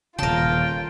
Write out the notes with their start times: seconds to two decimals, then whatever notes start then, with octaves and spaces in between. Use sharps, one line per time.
0.19 D#1 C#3 F4 A#4 G5 A5